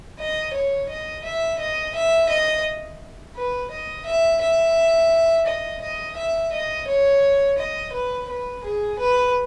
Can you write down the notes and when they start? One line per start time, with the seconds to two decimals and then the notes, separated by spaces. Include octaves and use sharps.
0.19 D#5
0.53 C#5
0.89 D#5
1.24 E5
1.59 D#5
1.95 E5
2.29 D#5
3.35 B4
3.71 D#5
4.05 E5
4.41 E5
5.46 D#5
5.81 D#5
6.17 E5
6.52 D#5
6.87 C#5
7.58 D#5
7.93 B4
8.29 B4
8.63 G#4
8.99 B4